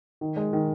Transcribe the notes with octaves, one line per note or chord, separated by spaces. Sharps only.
D#3
G#3
D#3